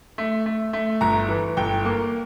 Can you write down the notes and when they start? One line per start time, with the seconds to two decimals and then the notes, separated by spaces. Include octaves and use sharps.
0.18 A3
0.46 A3
0.73 A3
1.01 G1 A#5
1.29 E3
1.57 G1 G5
1.85 A#3